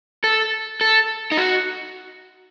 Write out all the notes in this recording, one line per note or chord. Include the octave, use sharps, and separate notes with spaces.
A4
A4
D#4
F#4